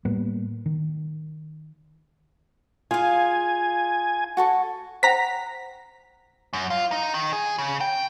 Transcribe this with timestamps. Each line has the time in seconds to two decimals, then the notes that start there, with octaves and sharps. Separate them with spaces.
0.05 A2 G3 A#3 B3
0.66 D#3
2.91 F4 G#4 F5 G#5
4.37 F#4 A4 C#6
5.03 C5 F#5 G5 A#5 B6
6.53 F#2
6.70 F4
6.92 D#4
7.14 D#3
7.33 G#4
7.58 C#3
7.81 G5